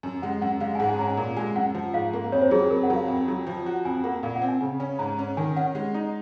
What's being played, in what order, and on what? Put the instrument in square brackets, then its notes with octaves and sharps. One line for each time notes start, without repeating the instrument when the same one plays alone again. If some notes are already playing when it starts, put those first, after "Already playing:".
[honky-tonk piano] F#2 [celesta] G#5
[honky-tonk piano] G#3 [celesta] F#5
[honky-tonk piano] F#2 [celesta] F#5
[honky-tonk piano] G#3 [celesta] F5
[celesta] G#5
[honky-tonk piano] G#2 [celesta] F#5
[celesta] G#5
[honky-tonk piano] C#4 [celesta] A#5
[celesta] G#5
[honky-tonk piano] A#2
[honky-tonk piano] G#3 [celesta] G#5
[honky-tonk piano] F#2 [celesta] F#5
[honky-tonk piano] F3
[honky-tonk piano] G#2 [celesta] F5
[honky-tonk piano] A#3
[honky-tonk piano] F2 [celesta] C#5
[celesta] C5
[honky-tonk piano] F#3 [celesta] G#4
[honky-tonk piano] F2 [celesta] A#4
[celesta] F#5
[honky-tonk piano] F#3
[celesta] F5
[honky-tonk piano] F2
F#3
F3
F#4
[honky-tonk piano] F2 [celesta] G#5
[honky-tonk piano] A#3 [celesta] F#5
[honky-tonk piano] A#2 [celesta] F5
[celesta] F#5
[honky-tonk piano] C4
[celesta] G#5
[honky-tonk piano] C#3 [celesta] G#5
[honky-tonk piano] C#4 [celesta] G#5
[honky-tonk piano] G#2 [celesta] A#5
[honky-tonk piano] C#4
[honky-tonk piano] D#3 [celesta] G#5
[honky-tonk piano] C#4 [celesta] F#5
[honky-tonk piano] G#3
D#4